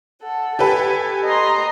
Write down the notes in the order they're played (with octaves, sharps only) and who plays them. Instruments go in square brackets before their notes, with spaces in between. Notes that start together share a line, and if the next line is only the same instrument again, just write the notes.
[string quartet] A4 F#5
[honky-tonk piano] G4 A4 B4 [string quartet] G#5
[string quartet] D#5 A#5 C6